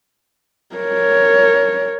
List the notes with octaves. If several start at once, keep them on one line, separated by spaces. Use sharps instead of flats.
A#4 C#5